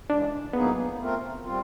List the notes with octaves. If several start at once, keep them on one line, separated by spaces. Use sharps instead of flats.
C#3 E3 G#3 D4
A2 F#3 A#3 B3 D#4 G#4
A3 C4 F4 A#4
G3 C4 F4